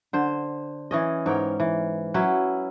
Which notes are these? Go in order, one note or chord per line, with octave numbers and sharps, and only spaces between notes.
D3 C5
E3 C#4 D#5
G#2 A#4 C#5 G5
E3
F#3 C#4 E4 B4